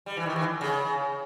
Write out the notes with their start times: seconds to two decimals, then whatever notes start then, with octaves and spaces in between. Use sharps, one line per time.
0.06 G3
0.17 E3
0.26 D#3
0.36 E3
0.61 C#3